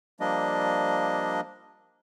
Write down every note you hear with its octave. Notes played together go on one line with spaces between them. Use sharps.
F3 G3 A#3 D4 D#5